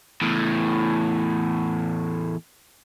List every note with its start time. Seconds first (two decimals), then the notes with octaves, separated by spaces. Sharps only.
0.22 E2 A2